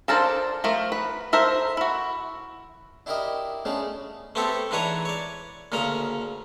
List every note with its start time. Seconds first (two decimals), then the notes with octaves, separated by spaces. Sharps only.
0.08 D4 F4 A4 A#4 C5
0.64 F3 A3 A#4
0.92 B4
1.33 A4 A#4 C5 E5
1.77 E4 F#4
3.06 D4 E4 F#4 G4 A#4 D#5
3.65 G#3 A3 B3 C#4 D4 F#4
4.35 A3 B3 C4 G4 A4
4.71 G#2 E3 D4 B4 C#5 A#5
5.05 C#5 D5
5.72 D2 A#2 C#3 A#4 A#5